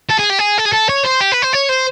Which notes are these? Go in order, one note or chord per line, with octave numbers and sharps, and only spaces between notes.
A4
G#4
G4
G#4
A4
G#4
A4
C#5
C5
G4
B4
C5
C#5
C5